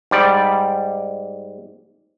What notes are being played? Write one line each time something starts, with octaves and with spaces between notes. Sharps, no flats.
G#2 G3 D5